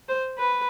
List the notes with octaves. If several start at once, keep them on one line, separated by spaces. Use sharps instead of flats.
C5
B4